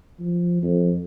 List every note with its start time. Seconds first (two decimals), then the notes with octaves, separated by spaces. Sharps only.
0.20 F3
0.63 F2